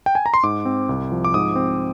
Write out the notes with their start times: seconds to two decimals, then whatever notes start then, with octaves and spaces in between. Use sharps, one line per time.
0.06 G5
0.15 G#5
0.26 A#5
0.34 C6
0.43 G#2 D6
0.65 C4
0.89 C2
1.12 F3
1.24 D6
1.34 G#2 D#6
1.56 C4